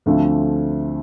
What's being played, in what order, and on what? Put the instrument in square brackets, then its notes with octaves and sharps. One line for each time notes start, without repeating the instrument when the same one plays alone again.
[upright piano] D2 D3 F3 A3 C4